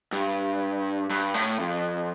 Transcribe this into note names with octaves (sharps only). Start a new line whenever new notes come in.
G2
G2
A2
F2